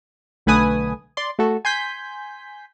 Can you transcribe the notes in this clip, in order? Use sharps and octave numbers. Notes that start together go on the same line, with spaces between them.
B1 D3 A3 B4 G#5 D#6
D5 C6
A3 F#4 A4
G#5 C6 G6 B6